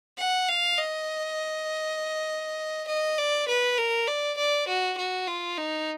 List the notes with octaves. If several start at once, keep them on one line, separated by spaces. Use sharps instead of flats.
F#5
F5
D#5
D#5
D5
B4
A#4
D5
D5
F#4
F#4
F4
D#4